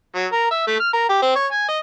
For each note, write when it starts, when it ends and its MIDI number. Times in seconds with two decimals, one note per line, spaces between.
0.15 0.26 54
0.32 0.46 70
0.51 0.65 76
0.67 0.78 57
0.80 0.93 89
0.93 1.04 70
1.09 1.19 67
1.22 1.33 60
1.36 1.47 73
1.52 1.68 80
1.69 1.78 75